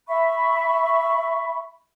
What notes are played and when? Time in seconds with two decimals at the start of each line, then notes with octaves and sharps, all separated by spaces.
0.08 E5 B5 C#6